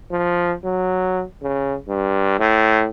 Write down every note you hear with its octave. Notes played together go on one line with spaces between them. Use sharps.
F3
F#3
C#3
G2
A2